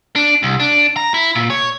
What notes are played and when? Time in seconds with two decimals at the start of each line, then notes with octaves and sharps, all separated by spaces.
0.16 D4
0.43 C2
0.60 D4
0.97 A#5
1.14 E4
1.35 A#2
1.50 C#5